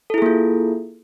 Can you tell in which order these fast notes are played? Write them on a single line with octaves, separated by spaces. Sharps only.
A4 E4 G#4 A#3 F4